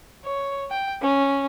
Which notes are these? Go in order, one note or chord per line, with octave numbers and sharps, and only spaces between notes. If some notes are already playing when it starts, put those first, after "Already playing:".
C#5
G5
C#4